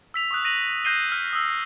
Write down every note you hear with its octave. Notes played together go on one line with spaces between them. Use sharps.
E6 B6 F7
C#6 D#6 F#6
A#6 D#7 F7 F#7
F#6 G6 A#6 C7 D#7 G7
F6
D#6 E6